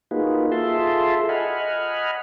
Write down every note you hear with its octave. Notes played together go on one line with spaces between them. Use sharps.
A#3 D#4 F4 F#4 G#4 B4
F4 G#4 A4 E5 A5 C6
D#5 F#5 G#5 B5 F6